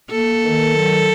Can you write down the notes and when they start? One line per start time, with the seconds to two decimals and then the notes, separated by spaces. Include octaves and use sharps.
0.10 A#3 A4
0.43 D#3
0.76 F#3